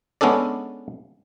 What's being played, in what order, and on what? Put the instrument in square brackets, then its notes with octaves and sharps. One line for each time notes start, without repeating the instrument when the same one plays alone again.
[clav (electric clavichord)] G#3 B3 C#4 D4 A4 D5